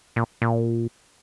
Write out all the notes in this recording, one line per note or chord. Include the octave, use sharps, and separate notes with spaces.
A#2
A#2